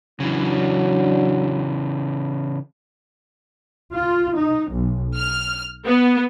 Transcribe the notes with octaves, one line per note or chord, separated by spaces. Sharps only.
C#3 E3 F#3 D4
F4
D#4
B1
F6
B3